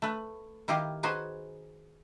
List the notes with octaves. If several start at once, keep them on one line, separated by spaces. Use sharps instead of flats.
A3 B4
D#3 E4 G4 D#5 F5
D#4 F#4 G#4 B4 C5